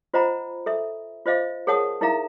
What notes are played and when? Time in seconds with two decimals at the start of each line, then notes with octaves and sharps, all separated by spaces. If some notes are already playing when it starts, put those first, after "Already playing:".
0.14 F4 C5 D#5 F#5 A#5 B5
0.66 A4 E5
1.26 F4 C5 D#5 F5
1.67 G#4 A#4 C#5 F#5 A5 D#6
2.01 D#4 E4 A#4 E5 F5 A#5